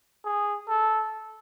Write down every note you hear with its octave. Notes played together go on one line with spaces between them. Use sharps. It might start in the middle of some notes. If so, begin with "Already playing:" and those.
G#4
A4